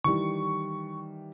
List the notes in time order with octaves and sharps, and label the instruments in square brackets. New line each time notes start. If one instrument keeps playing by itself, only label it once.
[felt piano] D#3 E3 G3 [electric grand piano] C#6